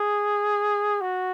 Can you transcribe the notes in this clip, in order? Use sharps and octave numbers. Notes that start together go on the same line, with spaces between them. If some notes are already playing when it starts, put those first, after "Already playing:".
Already playing: G#4
F#4